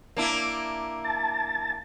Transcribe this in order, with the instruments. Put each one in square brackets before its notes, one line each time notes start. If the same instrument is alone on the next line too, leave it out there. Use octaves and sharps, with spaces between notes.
[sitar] A#3 D4 E4
[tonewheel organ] A5